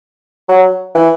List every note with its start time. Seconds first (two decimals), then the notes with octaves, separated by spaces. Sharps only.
0.49 F#3
0.95 E3